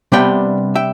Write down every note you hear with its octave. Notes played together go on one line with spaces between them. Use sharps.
C3 G3 B3 D4 E5 G5
E5 G5